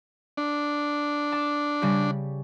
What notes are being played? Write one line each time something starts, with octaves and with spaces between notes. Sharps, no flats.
D4
A5 D6
C#3 G3 G4